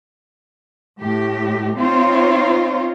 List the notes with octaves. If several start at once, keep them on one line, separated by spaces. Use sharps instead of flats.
A2 G4
C4 D#4 F4 C5 C#5